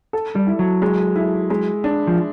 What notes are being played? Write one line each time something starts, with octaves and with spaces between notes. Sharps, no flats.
A4
G3
E4
F#3
G#3
E4
G#3
D4
F3